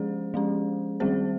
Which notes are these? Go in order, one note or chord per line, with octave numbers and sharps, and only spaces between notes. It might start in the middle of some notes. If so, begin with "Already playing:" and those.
Already playing: F3 G#3 C#4 G#4 C5
F3 G#3 C#4
D#3 G3 C4 G#4 C5